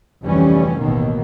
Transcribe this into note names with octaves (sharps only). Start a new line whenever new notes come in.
F1 D2 E3 G3 C#4
A1 D#2 B2 D#3 A#3